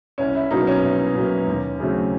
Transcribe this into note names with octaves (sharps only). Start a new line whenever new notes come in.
C2 C#4
E4
B2 F#3 A#3 D#4
C#4
C2
B2 F#3 A#3
D#2
C#3 F#3 A3 C4